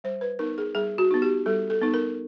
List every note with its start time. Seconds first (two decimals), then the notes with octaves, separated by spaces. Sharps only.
0.04 G3 C5
0.21 B4
0.39 B3 D#4 A#4
0.58 G#4
0.75 G3 G#4
0.98 F#4
1.11 B3 D#4
1.22 G4
1.46 G3 A4
1.70 A4
1.82 B3 D#4
1.94 A#4